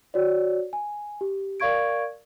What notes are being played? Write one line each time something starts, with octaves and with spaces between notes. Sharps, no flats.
F#4 C#5 D5
G#5
G4
A#4 D5 F5 C#6 G#6 D7